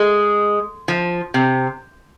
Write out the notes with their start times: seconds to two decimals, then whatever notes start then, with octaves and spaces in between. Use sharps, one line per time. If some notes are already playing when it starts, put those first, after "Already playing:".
Already playing: G#3
0.88 F3
1.34 C3